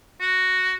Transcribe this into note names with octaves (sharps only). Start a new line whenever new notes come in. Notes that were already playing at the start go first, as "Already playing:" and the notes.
F#4